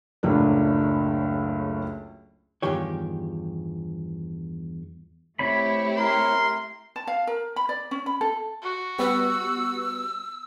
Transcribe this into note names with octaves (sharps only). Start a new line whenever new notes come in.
F#1 C#2 A2 F#3 D4
E2 G2 D#3 F3 G4 C#5
A3 C4 E4 G4 C#5 B5
A#4 C6
A5
F5
A#4
B5
D5
C#4
B5
A4
F#4
G3 B3 E6